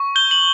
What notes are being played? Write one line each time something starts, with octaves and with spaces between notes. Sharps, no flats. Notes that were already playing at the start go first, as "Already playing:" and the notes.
Already playing: C#6
G6 G7
F#7